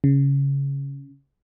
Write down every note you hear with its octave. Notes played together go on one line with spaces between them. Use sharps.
C#3